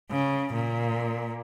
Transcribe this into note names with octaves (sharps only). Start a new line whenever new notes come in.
C#3
A#2